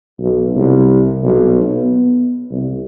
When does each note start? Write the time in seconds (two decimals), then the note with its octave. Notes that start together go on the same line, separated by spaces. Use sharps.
0.20 B1
0.56 C2
1.23 B1
1.61 B3
2.51 C2